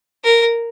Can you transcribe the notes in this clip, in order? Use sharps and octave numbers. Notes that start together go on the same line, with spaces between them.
A#4